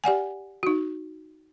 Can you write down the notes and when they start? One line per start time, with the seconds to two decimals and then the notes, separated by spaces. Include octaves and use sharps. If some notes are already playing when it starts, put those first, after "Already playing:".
0.04 G4 D5 F#5 G#5
0.63 D#4 F#4